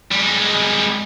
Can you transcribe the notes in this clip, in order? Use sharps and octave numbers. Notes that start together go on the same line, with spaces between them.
G3 G#3